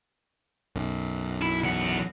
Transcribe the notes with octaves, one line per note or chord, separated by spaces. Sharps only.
B1 F#2
E4
E2 F#5